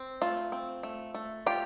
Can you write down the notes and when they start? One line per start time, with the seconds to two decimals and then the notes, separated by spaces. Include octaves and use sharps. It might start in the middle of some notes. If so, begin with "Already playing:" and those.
Already playing: C4
0.21 A3 F4
0.52 C4
0.83 A3
1.14 A3
1.46 F4 G4